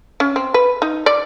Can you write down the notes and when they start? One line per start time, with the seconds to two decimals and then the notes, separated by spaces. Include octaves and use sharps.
0.20 C#4
0.36 C4
0.54 B4
0.82 D#4
1.06 D5